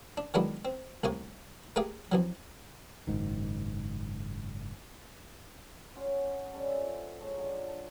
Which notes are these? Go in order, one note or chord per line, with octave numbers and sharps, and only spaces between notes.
D4
D#3 F#3 G#3 B3 D4 E4
C4
C2 A2 A#3 G#5 C#6
A3 A#3 G4 G#4 F5 G5
F2 E3 F#3
F#1 G#2 D#3
C#4 F#4 F5 C6
G3 C#4 A4
F4 C5 E5 F#5
G#3 C#5 A5
F#3 D4 F4
A5